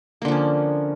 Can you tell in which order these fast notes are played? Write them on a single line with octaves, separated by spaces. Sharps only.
A#3 D3 F3 C#4